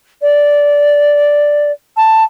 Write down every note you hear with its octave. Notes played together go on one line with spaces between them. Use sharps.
D5
A5